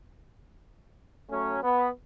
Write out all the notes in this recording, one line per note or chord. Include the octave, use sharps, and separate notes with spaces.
F#3 A3 C#4
B3